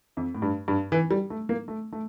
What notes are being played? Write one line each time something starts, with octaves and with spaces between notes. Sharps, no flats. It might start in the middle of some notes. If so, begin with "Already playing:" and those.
F2
A2
G2
G2
E3
G3
A3
A#3
A3
A3